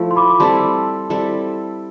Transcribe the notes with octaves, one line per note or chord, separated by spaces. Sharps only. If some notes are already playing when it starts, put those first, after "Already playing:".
Already playing: F3 A3 E4
C6
B5 D6
B5
G3 C4 E4 A4 A5 C6
G3 C4 E4 A4